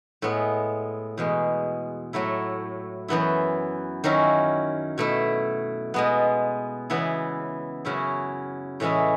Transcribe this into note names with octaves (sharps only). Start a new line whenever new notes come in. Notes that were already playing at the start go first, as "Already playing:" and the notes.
A2 G#3 B3
E2 B2 G#3
A2 F#3 A3 E4
F#2 E3 B3 E4
D#3 F#3 C#4 E4
B2 A3 E4
B2 G#3 B3
C#3 E3 B3 E4
F#2 C#3 F#3 C#4 E4
A2 E3 G#3 C#4 E4